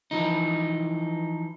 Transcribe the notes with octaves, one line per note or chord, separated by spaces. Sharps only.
E3 F3 D#4